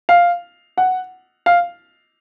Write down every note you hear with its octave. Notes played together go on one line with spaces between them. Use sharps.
F5
F#5
F5